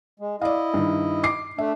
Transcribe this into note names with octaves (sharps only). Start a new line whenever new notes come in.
G#3
E4 D5 D#5 F5
G2 D#3
D6 C7
A3 D4 E5